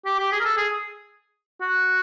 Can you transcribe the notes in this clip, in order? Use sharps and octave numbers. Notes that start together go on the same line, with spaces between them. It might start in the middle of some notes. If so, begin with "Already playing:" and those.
G4
G4
G#4
A#4
A4
G#4
F#4